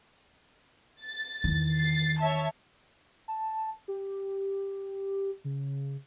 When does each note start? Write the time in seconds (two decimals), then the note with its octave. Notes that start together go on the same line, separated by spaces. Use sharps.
1.04 A6
1.44 E2 D#3
1.77 A6 C7
2.19 C#5 E5 A5
3.28 A5
3.88 G4
5.45 C#3